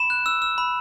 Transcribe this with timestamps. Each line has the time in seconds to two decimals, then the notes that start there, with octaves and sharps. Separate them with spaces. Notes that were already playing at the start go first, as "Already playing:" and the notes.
Already playing: B5 E7
0.10 F#6
0.26 E6
0.42 E6
0.58 B5